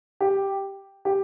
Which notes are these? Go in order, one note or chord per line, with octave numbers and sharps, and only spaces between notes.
G4
G4